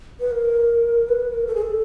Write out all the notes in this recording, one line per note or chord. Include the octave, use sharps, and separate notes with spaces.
B4
A#4
B4
B4
A#4
A4
G#4
A4